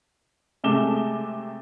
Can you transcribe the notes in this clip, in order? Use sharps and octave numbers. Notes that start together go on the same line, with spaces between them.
C3 G#3 A3 D6 E7 G7